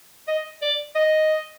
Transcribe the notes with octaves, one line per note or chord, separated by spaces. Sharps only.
D#5
D5
D#5